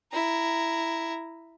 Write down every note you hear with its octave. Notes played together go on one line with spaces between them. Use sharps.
E4 A#5